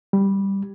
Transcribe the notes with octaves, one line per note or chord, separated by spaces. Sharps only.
G3